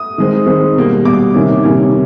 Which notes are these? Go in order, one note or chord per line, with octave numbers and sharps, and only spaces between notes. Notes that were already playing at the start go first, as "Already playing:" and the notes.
Already playing: D#6
D#3 G#3 C4
D#3 G#3 C4
B2 G3 A#3
B2 G3 A#3 D6
C3 D#3 G3 A#3 C#4
C3 D#3 G3 A#3 C#4